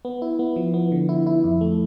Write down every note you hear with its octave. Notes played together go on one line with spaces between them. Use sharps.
B3
E4
B3
F3
B3
D3
E4
E4
F2
A3